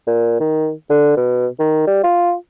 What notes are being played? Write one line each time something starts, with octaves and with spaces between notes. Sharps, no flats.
A#2
D#3
D3
B2
D#3
G3
F4